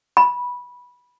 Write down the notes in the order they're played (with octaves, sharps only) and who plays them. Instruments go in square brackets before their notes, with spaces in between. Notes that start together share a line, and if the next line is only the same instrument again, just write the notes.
[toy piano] B5